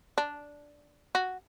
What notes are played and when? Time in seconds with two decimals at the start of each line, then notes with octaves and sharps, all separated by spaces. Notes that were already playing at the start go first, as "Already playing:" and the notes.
0.18 D4
1.15 F#4